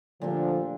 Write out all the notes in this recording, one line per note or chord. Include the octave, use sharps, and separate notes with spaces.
A#2 D3 F3 A3 D4 G4